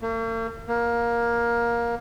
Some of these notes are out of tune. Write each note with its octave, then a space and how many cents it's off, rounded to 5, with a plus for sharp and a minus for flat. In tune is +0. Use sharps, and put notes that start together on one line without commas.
A#3 -45
A#3 +15